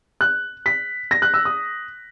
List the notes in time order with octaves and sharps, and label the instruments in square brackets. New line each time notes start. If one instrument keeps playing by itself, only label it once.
[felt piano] F#6
B6
A#6
F#6
E6
D#6